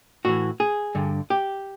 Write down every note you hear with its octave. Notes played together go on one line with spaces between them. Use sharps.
A2 E3 F#4
G#4
G2 D3
G4